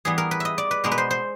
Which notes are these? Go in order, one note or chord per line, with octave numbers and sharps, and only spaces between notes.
E3 G3 B3 G#4
A#4
B4
D#5 E5
D5
B4
B2 G#3 B3 A#4
B4
C5
C5